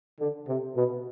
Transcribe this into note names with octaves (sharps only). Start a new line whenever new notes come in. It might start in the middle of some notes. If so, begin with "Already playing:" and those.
D3
C3
B2